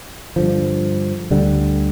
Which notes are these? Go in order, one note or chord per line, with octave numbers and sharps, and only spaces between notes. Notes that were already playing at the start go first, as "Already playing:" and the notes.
G2 D3 F3
D2 D3 G3